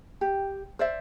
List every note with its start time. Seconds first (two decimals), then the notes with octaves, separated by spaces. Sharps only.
0.21 G4
0.79 C5 D5 E5